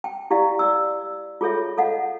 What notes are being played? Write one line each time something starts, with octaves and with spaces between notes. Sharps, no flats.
G5
E4 G4 D5 F5
D5 E6
F4 G#4 A4 C#5 E5
A4 D#5 F5 F#5